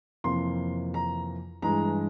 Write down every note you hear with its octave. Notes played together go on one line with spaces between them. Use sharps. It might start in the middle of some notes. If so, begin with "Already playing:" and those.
F2 C3 E3 A#3 C6
A#5
G2 E3 G#3 A#5